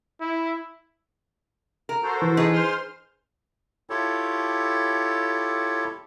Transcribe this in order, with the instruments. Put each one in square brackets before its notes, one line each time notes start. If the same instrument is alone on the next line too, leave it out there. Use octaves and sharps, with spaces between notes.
[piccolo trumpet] E4
[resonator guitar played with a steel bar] A#4
[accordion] F#4 A4 C5
[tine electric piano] E3
[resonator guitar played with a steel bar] D#4 G#4 B4
[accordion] C5 C6 F6
[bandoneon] E4 F4 G4 A4 C#5